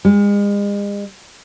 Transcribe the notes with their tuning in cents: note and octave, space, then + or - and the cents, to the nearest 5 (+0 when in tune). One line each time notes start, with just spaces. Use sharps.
G#3 -40